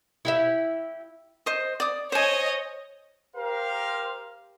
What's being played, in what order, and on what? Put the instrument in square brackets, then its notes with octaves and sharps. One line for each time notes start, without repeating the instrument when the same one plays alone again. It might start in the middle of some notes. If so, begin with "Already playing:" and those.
[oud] E4 G4 E5
[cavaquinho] C5 D#5
D5 D#6
[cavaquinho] C5 G#5 [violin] C#5 D#5
[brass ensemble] G4 A#4 C5 F5